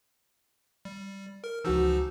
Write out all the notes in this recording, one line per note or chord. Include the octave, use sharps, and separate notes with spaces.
G3
A#4
C#2 E3 F3 D#4 F#4 E6